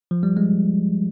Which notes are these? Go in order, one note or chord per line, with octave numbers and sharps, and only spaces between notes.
F3
G3
G#3